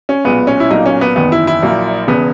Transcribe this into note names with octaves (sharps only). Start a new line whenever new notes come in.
C#4
B1 A#2 G#3 B3
C#4
E4
B1 A#2 F#3 A#3 D#4
C#4
B3
F#1 E2 D#3 B3
E4
E4
A#1 A#2 F#3 A#3
E1 E2 C#3 B3